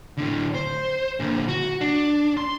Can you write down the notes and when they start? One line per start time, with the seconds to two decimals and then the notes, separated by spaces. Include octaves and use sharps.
0.18 A2 D3
0.55 C5
1.20 A#2 D3
1.48 F#4
1.81 D4
2.37 C6